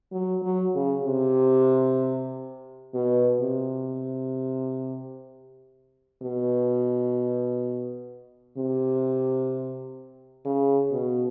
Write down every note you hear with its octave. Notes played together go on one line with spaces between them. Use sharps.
F#3
F#3
C#3
C3
B2
C3
B2
C3
C#3
B2